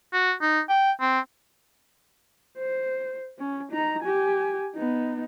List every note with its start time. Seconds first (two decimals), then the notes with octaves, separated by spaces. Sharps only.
0.13 F#4
0.42 D#4
0.69 G5
1.01 C4
2.58 C5
3.38 C#4
3.72 D#4 A#5
4.03 G4 G#5
4.75 B3 D#4